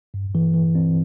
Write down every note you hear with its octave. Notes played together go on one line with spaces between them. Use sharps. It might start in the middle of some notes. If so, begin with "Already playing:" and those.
G2
E3
E3
C4